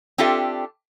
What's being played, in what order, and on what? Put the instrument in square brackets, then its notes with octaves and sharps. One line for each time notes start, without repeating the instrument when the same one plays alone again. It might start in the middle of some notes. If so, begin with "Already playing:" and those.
[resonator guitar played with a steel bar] C4 D4 F4 G4 A4 E5